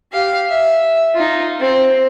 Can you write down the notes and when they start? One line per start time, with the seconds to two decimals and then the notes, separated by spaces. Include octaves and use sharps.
0.12 G4 F5
0.48 E5
1.14 D#4 F4
1.60 C4